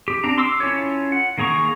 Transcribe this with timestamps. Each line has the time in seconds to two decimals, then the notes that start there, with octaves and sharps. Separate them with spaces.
0.08 G4
0.24 C4 D4 A#5
0.38 C6 D6 E6
0.60 C#4 E4 F4 A4 C#5
1.12 F#5
1.38 D#3 A#3 G#4 A#5 C#6